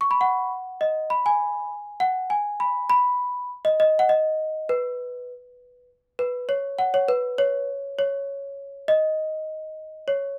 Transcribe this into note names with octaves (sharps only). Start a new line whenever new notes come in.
C#6
B5
F#5
D#5
B5
G#5
F#5
G#5
B5
B5
D#5
D#5
F#5
D#5
B4
B4
C#5
F#5
C#5
B4
C#5
C#5
D#5
C#5